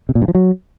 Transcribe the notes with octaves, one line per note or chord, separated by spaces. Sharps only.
C3
A#2
G2
F3
F#3